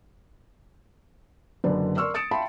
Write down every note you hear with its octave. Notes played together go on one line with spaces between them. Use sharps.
F#1 F#2 D3 B4 D5
A#4 D5 C6 C#6 E6 F6
D#6 A6 C#7 D7 E7
E5 F5 G5 A5 B5 C6